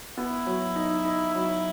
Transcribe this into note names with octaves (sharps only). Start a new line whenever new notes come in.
B3 E4
F#3
D#4
D#4
F#3